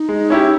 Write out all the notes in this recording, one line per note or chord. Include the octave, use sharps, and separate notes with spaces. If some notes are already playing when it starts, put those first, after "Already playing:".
Already playing: D#4
G#3
C#4 E4 G4